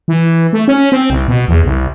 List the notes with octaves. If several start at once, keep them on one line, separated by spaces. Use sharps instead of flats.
E3
A3
C#4
C4
C2
B2
E2
C2